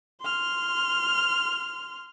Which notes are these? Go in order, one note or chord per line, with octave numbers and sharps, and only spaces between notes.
C6 F6